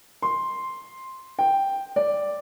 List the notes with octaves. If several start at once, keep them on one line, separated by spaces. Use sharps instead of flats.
C6
G5
D5